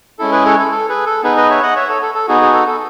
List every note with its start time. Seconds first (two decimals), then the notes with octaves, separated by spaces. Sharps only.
0.19 G#3 C#4 E4 A4
0.32 G#4 B4
0.45 A4 C#5
0.59 A4
0.71 A4
0.89 G#4 B4
1.06 A4
1.23 B3 D#4 G#4 B4
1.37 B4 D#5
1.50 C#5 E5
1.62 D#5 F#5
1.76 C#5 E5
1.89 A4 C#5
2.02 A4
2.14 A4
2.27 B3 D#4 F#4 G#4
2.41 G#4
2.54 A4
2.67 A4